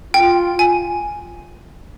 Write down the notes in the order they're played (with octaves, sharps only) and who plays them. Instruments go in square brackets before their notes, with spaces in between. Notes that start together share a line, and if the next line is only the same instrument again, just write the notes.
[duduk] F4 [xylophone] G5
[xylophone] G#5